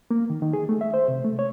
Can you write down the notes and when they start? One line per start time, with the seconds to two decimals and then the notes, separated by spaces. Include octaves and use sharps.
0.11 A#3
0.30 D#3
0.42 D#3
0.53 G#4
0.69 A3
0.81 E5
0.94 C5
1.08 C3
1.24 A3
1.39 C#5